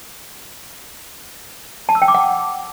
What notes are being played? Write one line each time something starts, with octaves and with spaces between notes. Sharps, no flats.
A5
E6
G5
D6
F#5